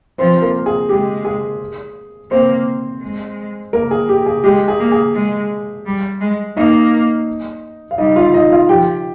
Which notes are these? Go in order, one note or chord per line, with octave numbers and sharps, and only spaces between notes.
F3 C4 C5
A#3 A#4
G#4
G#3 G4
G#4
A#3 C4 C5
G#3
A#3 A#4
G#4
G4
G#4
G#3 G4
G#4
A#3
G#4
G#3
G3
G#3
A#3 D#4 D#5
F5
G3 D#4 D#5
F4 F5
D#4 D#5
F4 F5
F3 G4 G5